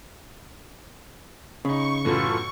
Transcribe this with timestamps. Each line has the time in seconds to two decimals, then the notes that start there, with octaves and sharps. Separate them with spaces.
1.65 C#3 D#4 B5 C#6
2.05 F#2 A2 E3 F4 A4